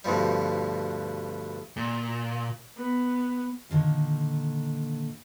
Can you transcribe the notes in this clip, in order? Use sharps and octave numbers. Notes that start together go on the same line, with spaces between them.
D2 G2 B2 F3 G3
A#2
B3
A#2 D3 D#3 A#3